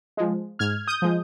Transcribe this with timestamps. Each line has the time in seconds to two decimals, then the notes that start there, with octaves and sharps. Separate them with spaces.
0.17 F3 G#3
0.59 G#2 F6 G#6
0.88 D#6 G6
1.02 F3 G#3